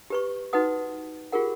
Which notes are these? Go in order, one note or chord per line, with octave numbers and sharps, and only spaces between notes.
G4 B4 C#6
D#4 F#4 B4 F#5 D#6
F4 G4 G#4 A#4 F#5